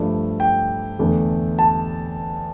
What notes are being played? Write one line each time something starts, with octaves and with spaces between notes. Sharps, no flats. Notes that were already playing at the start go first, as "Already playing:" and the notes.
Already playing: G2 F3 A3
G5
E2 D3 A3
A5